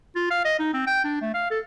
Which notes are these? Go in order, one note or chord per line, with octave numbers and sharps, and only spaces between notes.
F4
F5
D#5
D#4
C4
G5
D4
A3
F5
A4